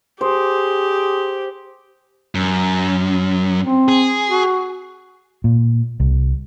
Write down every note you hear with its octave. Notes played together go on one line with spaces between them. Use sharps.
G4 G#4 C5
F#2
C4
G#4
F#4
A#2
C2